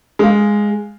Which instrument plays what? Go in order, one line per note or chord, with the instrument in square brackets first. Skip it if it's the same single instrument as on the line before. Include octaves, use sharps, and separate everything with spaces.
[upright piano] G#3 F5